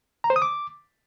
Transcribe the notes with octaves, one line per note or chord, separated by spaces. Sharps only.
A#5
C5
D#6
D6